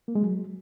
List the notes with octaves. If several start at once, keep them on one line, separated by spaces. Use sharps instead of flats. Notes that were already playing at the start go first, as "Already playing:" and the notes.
A#3
G#3
F#3